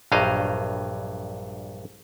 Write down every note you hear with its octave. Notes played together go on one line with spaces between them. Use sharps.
A#1 G2 F#3 G3 D#5 F5